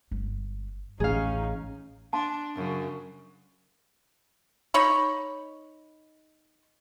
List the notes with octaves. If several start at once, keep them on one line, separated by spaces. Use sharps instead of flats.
G1
A1 D2 D3 C#4 D#4 G#4 F5
D4 A5 C6
F#2 C#3
D#4 C#5 B5